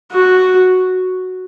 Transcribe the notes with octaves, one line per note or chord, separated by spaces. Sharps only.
F#4